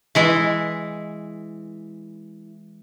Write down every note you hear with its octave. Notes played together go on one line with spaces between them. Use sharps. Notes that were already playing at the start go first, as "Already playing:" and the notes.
E3 G#3 E4